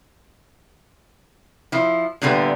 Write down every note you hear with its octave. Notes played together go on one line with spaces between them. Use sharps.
F3 E4
A#2 D3 G3 A3 B3